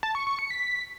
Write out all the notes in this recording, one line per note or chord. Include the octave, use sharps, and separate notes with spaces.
A5
C#6
C#6
C#7
B6